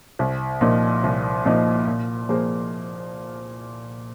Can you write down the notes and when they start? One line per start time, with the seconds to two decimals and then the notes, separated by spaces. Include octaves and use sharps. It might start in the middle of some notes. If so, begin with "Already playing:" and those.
0.19 C2
0.61 A#2 F3 A#3 D#4
1.04 C2
1.45 A#2 F3 A#3 D#4
1.87 A#2
2.29 F3 A#3 G#4 C5